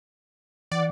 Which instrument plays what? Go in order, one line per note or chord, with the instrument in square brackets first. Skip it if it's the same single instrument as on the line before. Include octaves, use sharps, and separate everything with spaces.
[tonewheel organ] E3 F#5 [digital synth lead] D5